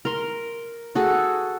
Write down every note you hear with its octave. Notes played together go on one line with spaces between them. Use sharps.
A#4 C6
F#4 G#4 A4